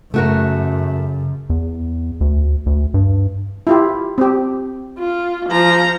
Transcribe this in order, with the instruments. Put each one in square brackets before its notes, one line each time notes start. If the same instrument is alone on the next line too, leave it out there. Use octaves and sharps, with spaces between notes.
[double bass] F#2 [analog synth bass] C#3 [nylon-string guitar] A3 F#4 A#4
[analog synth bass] E2
D2
D2
G2
[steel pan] E4 F4 G4
C4 G4
[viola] F4
F3 A#5